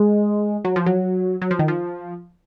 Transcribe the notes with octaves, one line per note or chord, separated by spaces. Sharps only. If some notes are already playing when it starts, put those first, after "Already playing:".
Already playing: G#3
F#3
F3
F#3
F#3
F3
D#3
F3